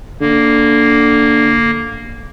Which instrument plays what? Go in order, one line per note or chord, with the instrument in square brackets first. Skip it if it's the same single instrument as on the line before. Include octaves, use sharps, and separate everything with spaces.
[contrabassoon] D3 [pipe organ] A#3